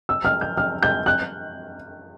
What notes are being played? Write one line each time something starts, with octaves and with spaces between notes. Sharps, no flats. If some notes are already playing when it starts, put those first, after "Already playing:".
E6
F6
G6
F6
G6
F#6